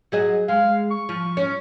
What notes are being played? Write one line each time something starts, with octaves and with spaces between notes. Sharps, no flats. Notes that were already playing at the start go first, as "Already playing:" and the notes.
F#3 G#4 D#5
G#3 F5
C#6
F3
C#4